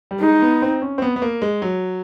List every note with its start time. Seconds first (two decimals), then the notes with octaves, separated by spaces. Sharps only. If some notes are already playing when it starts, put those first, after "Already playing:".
0.11 G3
0.21 G#3 D#4
0.42 B3
0.62 C4
0.82 C#4
0.98 C4
1.02 B3
1.16 B3
1.22 A#3
1.42 G#3
1.62 F#3